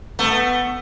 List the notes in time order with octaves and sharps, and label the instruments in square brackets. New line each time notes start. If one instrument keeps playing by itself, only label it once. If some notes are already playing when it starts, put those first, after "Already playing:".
[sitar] A3 [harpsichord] B3